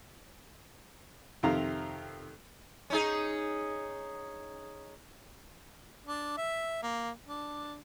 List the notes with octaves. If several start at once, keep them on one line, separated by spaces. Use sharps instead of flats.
F2 C3 D#3 F5 A#5
C#4 D#4 G#4
D4
E5
A#3
D4